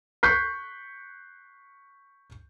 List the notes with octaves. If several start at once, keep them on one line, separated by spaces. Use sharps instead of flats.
C#6 F#6 G6 B6 C7